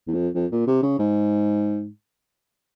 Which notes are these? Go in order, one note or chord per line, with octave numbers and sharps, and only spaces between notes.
E2
F2
F2
A#2
C3
C#3
G#2